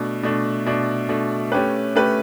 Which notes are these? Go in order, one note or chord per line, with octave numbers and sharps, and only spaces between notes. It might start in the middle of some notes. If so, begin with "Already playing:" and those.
Already playing: B2 A3 D4
B2 A3 D4
B2 A3 D4
B2 A3 D4
A3 C#4 G4 B4
A3 C#4 G4 B4